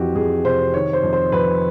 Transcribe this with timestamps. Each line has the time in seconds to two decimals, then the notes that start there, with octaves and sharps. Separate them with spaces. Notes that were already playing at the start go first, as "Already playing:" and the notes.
Already playing: F2 E3 F#4 G4
0.15 F2 G#4
0.45 C3 C5
0.74 D#3 C#5
0.93 C5
1.03 F2
1.13 C5
1.32 F2 B4